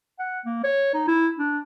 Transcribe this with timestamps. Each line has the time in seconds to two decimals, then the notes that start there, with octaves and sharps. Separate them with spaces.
0.19 F#5
0.45 A#3
0.64 C#5
0.94 D#4
1.08 E4
1.38 D4